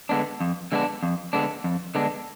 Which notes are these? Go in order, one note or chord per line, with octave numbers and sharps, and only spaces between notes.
D3 G#3 B3 D4
F2
D3 G#3 B3 D4
F2
D3 G#3 B3 D4
F2
D3 G#3 B3 D4